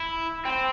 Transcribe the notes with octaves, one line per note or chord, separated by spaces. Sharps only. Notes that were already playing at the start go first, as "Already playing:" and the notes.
Already playing: E4
C4